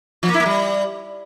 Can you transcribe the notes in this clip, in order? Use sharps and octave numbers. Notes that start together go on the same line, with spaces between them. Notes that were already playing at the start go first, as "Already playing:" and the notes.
F3
A#3
E4
A#3
G3